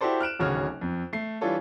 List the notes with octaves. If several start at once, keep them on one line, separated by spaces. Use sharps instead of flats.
E4 F#4 G4 A4 C5 D5
F6 F#6 D7 E7
D1 G#1 C#3 F#4 C#5 F6
F2
A3 C7
E3 G3 D4 F4 A4 C#5